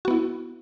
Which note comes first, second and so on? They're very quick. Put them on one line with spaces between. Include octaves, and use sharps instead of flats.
F#4 B3 E4